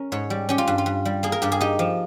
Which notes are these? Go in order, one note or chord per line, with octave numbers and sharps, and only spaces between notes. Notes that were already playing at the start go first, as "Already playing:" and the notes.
Already playing: C#4 A#4
G#2 C#5
G3
C#4 G4
F4
G2
F4
G2
G3
A#3 G#4
A#4
G2 G4
G#4
D#4 G4
F3